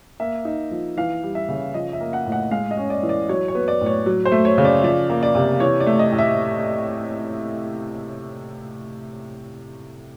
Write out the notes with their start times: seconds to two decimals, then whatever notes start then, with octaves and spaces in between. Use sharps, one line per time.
0.20 A#3 E5
0.45 D#4
0.71 F3
0.97 E3 F5
1.23 G3
1.35 E5
1.49 C#3
1.74 F3 D#5
1.93 E5
2.01 A#3
2.13 F#5
2.26 A2
2.32 F#5
2.51 G#3 F5
2.71 D#5
2.77 C#4
2.90 D5
3.03 E3
3.09 D5
3.29 F#3 C#5
3.48 C#5
3.55 B3
3.68 D5
3.81 A2
3.86 C#5
4.06 F#3
4.25 C5
4.32 A3
4.45 C#5
4.58 C#3
4.65 D5
4.83 F3 D5
5.10 A#3
5.23 D5
5.35 C3
5.60 E3 C#5
5.80 D5
5.87 A3
5.99 D#5
6.12 A2
6.18 E5